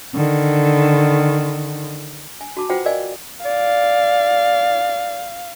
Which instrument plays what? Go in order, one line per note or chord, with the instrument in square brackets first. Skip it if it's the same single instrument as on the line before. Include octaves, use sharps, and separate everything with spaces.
[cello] D3 D#3
[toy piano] G#5
F#4 A5 D6
F4 F#4 B4 C5 F#5 G5
A#4 D5 D#5 F5 G#5
[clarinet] D5 [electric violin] F5